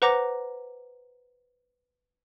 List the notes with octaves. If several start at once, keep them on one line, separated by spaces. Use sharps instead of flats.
B4 C5 F#5 A#5 D6 A#6